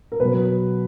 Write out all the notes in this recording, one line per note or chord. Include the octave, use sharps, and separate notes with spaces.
A#4
B2 F#3 B4